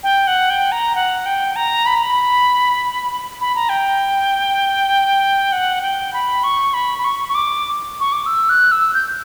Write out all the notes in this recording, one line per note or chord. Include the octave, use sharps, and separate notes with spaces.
G5
F#5
G5
A#5
F#5
G5
A#5
B5
A#5
B5
B5
A#5
G5
F#5
G5
B5
C#6
B5
B5
C#6
C#6
D6
C#6
D6
E6
F#6
E6
G6